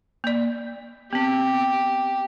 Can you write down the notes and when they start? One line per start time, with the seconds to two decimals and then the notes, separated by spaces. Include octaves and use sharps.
0.24 A#3 D5
1.13 B3 C4 G4